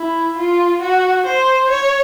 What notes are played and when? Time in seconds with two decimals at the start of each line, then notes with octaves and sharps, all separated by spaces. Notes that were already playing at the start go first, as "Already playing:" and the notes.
Already playing: E4
0.38 F4
0.82 F#4
1.26 C5
1.70 C#5